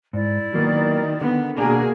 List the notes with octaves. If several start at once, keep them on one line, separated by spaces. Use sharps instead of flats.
G#2 E4 D5
D#3 F#3 A#3 B3
D3 B3
B2 A#3 D4 F#4 G#4 A#4